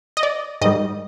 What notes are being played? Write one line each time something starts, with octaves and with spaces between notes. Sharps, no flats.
D#5
D5
G#2 D#3 G3 D#5